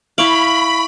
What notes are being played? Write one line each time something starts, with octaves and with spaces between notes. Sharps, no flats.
E4 F5 B5 C#6 D7 F#7